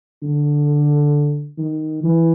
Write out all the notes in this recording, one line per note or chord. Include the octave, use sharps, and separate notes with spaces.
D3
D#3
E3